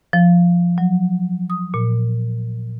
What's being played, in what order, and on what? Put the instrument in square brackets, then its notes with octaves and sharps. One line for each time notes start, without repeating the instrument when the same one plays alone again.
[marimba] F3
F#3
D#6
A#2